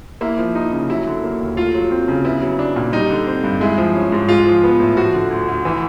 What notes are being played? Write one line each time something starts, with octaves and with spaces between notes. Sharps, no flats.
A#3 E4
F3
D#4
C#3
F#3 E4
D3
A#3
D#2
A3 F4
F#3
C4
C#3
B3 E4
F#3
D4
A#2
G3 D#4
D3
C4
G2
G#3 E4
F3
C#4
G#2
G#3 F4
F3
B3
A2
F3 F#4
D3
D2
D2
E3